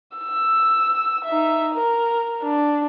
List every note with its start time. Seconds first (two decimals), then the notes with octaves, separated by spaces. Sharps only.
0.17 E6
1.25 D#4 E5
1.75 A#4
2.43 D4